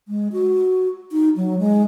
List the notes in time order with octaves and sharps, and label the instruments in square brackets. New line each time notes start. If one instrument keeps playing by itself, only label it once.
[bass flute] G#3
F#4
D#4
F#3
G#3